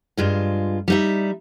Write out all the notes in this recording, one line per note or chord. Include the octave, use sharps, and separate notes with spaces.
G2 G#3 F4
G3 D#4 E5